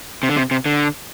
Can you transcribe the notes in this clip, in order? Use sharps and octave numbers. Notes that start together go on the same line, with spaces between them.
C3
D3
C3
C3
D3